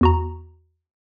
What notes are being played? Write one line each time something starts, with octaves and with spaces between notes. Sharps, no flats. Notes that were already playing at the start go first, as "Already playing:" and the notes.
E2 F#4 A#5